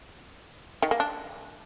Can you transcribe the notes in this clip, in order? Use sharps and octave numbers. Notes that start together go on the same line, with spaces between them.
D#3
A#3
D4